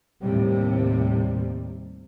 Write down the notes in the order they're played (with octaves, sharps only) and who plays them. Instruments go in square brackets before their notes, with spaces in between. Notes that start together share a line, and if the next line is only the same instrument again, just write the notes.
[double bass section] D#2 A2 C3 G3